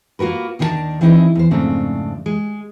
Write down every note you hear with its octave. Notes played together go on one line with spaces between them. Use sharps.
A#3 F4 F#4 A#4 B4
D#2 D#3 D4 E4 A#4 A5
E3 C4 D#4 E4 G#4 D#5
E2 C5
F2 G#2 C#3 A3 C4 D4
G#3